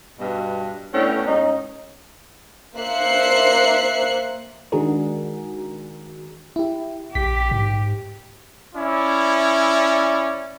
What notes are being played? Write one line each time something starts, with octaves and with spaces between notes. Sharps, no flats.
G2 B2
A2 B3 C#4 D4 G5
G#2 C#4 D#4
A#3 C5 E5 F#6 C7 C#7
D#3 G#3 D4 F#4 G#4 A#4
E4 G4
A#1 G4 B6
G#2
C#4 E4 D5